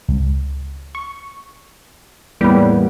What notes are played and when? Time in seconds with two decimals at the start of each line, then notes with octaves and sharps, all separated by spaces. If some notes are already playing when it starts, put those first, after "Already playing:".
0.09 C#2
0.95 C#6
2.41 E2 A2 E3 G3 A#3 B3 B4